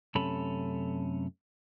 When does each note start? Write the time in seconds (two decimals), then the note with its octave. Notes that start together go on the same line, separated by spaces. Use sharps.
0.15 F#2 C3 A3 C#4 A4 B5